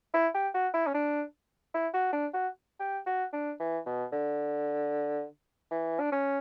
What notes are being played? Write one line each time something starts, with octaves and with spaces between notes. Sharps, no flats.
E4
G4
F#4
E4
C#4
D4
E4
F#4
D4
F#4
G4
F#4
D4
E3
B2
D3
E3
D4
C#4